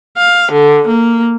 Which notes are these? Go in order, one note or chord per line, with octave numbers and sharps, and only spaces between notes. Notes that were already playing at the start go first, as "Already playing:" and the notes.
F5
D3
A#3